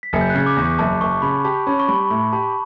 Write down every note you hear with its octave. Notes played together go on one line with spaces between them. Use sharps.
B6
F#1 C#7
G6
C#3 F#6
D6
E2
C#6
F#1 A5
F#1 C#6
C#3 B5
G4 A5
C#4 B5
C#6
G3 B5
A2 B5
G4 A5